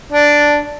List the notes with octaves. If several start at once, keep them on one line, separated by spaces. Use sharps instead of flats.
D4